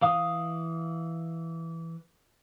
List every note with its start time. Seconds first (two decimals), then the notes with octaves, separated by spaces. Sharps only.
0.01 E3 F5 D#6